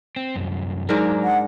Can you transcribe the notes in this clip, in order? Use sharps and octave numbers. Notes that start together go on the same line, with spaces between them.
C4
C2 F#2
G#2 F#3 D4 A#4
F#5